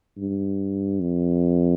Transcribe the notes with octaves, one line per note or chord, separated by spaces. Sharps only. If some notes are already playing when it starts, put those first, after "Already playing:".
G2
F2